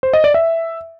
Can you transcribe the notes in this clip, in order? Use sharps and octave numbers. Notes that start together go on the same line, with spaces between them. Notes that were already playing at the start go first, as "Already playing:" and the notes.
C5
D#5
D5
E5